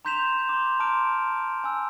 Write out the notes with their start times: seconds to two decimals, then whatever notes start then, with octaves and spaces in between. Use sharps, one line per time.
0.05 A#5 C6 G6 B6 E7 F7
0.49 C6 D6
0.80 A5 A#5 C6 D6 F6 D7
1.64 G#5 E6